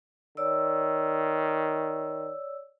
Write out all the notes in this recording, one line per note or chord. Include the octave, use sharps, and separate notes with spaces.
D#3 C#5 D5 E6